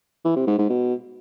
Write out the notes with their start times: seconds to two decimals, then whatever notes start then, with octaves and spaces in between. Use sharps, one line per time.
0.25 E3
0.36 C3
0.47 G#2
0.58 G#2
0.69 B2